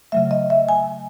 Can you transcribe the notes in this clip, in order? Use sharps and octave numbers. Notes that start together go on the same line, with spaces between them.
C#3 F#3 A3 E5
D#5
E5
G#5